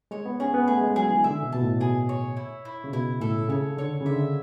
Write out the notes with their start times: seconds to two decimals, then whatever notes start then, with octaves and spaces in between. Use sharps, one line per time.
0.11 G#3 C#5
0.26 B3
0.40 C#4 G#4
0.54 B3
0.67 A3 G#4
0.81 G#3
0.96 F#3 G#4
1.10 E3
1.24 D3 E5
1.42 B2
1.52 B2 A5
1.62 A2
1.80 B2 G#4
2.09 C#5
2.37 E4
2.65 E4
2.84 C#3
2.93 B2 E4
3.21 A2 A4
3.49 C#3 C#5
3.77 D3 C#5
4.01 C#3
4.06 D3 E5